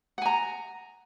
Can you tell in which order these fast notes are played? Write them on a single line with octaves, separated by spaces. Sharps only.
F#5 G#5 A#5